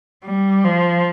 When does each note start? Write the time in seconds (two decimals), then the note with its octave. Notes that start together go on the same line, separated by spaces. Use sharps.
0.25 G3
0.64 F3